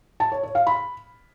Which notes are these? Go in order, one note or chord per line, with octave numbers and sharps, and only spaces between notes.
A5
C#5
C#5
F5
B5